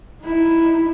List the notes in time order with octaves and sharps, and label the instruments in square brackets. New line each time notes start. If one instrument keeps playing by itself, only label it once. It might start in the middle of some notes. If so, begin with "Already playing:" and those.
[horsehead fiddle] D#4 E4